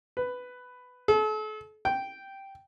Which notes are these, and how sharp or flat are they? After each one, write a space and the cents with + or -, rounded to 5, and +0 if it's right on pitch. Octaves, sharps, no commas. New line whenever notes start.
B4 +10
A4 -40
G5 -5